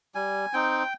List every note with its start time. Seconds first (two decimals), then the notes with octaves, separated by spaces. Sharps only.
0.15 G3 G#5
0.53 C4 D#4 G5